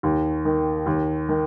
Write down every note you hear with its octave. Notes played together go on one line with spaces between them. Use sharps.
D#2
D#3
D#2
D#3